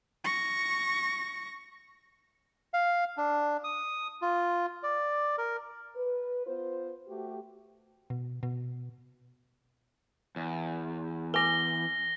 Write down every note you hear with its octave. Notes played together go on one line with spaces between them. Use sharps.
C#6 A#6
F5
D4
D#6
F4
D5
A#4
B4
B3 F4 C5
A3 F#4 G4
B2
B2
E2
B4 G#5 D6 A#6 G7